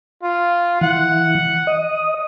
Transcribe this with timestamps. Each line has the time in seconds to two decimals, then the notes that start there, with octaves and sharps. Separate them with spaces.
0.23 F4
0.81 E3 F#5
1.67 D#5